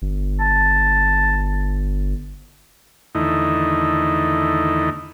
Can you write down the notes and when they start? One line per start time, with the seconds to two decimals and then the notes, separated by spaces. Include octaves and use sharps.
0.02 G1
0.40 A5
3.15 E2 D3 D#3 A3 D#4 E4